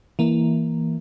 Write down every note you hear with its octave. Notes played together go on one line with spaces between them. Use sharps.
E3 A#3